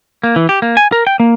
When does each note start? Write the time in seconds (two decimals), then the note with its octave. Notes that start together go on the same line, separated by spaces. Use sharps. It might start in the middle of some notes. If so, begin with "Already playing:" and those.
0.23 A#3
0.36 E3
0.49 G4
0.62 A#3
0.77 G#5
0.92 A#4
1.07 G5
1.20 A#3